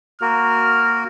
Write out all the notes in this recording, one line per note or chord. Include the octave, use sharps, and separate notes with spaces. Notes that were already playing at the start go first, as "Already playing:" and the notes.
A#3 F#4 A#4 F6